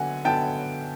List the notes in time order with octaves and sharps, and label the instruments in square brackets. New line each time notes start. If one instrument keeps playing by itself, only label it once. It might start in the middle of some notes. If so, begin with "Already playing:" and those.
Already playing: [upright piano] D3 F#3 B3 F#5 G#5
D3 F#3 B3 G5 A5